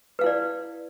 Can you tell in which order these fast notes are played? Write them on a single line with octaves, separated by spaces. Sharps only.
B4 F5 E4 D5